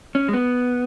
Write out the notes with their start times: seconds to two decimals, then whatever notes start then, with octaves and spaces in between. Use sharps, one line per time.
0.15 C#4
0.28 G#3
0.33 B3